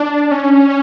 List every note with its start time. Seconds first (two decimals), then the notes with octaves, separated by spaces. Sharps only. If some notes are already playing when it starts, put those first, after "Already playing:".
Already playing: D4
0.31 C#4